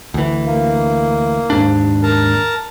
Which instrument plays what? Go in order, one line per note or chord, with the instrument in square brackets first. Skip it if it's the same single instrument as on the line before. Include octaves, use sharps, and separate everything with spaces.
[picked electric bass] D2 E3
[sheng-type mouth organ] A#3
[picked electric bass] D#2 G#2 D4
[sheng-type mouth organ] A#4 A5 A#5